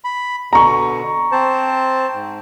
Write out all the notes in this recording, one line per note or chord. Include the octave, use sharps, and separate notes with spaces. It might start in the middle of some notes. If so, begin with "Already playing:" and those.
B5
B2 D3 A#5 C#6
C4 C5 A5
G#2